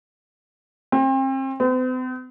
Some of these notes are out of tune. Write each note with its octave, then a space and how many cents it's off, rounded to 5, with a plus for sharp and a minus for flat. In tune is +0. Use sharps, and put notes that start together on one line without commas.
C4 +35
C4 -45